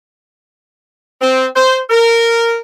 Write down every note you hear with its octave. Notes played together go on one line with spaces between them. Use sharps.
C4
C5
A#4